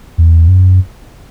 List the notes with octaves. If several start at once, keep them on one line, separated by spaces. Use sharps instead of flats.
E2
F#2